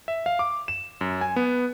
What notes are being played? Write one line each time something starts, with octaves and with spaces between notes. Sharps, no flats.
E5
F5
D6
E7
F#2
G#5
B3